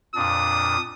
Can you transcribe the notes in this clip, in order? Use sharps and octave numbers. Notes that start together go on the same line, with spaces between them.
F2 A#2 D4 D#6